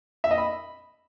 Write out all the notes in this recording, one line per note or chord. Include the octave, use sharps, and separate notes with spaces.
E5
D#5
B5